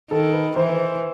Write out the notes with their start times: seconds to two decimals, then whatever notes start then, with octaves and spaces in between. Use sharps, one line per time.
0.11 D#3 A4
0.34 B4
0.56 E3 C5